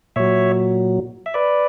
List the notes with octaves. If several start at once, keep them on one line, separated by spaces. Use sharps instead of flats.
A#2 F#3 C#5 E5
E5
B4 D5